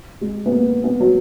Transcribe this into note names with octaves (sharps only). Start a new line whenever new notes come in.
G#3
B3
A#3
B3
F#3